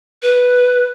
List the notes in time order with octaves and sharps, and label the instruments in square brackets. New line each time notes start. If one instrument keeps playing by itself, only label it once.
[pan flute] B4